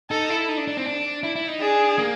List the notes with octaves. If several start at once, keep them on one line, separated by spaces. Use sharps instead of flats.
D#4 A4
E4
D#4
D4
D4
C4
D4
E4
E4
D#4
D4 G#4
A#3